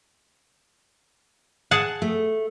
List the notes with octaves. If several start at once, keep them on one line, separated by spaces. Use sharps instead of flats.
G#4 F#5 A5
A3